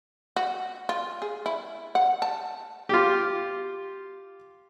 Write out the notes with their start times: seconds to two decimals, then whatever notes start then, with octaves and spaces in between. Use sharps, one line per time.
0.37 F#4
0.89 F4
1.22 G#4
1.46 E4
1.95 F#5
2.22 A5
2.89 F4 G4